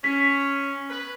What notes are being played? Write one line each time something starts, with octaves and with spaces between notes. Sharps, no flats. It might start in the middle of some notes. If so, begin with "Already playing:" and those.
C#4 B6
B4